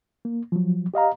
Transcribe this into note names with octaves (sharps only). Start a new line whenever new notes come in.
A#3
F3 F#3
G4 D#5 F5 A#5